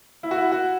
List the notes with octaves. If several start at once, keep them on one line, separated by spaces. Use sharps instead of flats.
E4
F#4
E4
F#4